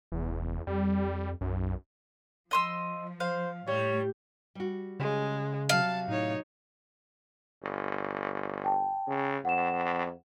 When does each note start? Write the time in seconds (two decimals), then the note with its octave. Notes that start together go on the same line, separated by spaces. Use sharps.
0.12 F1 E2
0.67 F2 G3
1.41 B1 F#2
2.51 F3 D#5 C6 E6
3.20 C5 F5
3.67 A2 G3 C#5
4.55 G3 F#4
5.00 C#3 G#3
5.69 C3 F#3 F5 A5
6.08 A2 D#4 C#5
7.62 G1
8.65 G5 A5
9.08 C#3
9.45 F2 F#5 E7